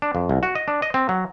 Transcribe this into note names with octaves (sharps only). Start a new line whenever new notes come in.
D4
F2
C2
F#4
D#5
D4
D#5
C4
F#3